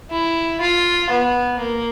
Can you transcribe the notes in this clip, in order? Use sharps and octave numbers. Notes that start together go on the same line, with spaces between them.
E4
F4
B3
A#3